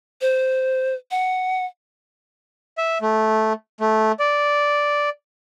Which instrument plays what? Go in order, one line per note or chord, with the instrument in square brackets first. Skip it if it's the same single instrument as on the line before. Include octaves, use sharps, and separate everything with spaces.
[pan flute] C5
F#5
[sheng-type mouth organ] E5
A3
A3
D5